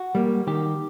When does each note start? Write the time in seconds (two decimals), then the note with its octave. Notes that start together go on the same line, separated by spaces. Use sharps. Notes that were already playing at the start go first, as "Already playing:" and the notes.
Already playing: F#4
0.15 G3 A#3
0.47 D#3 G4